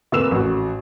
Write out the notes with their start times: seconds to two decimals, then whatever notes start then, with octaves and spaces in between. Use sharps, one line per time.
0.12 F1 A#3 B4 E6 E7
0.31 A1 F#4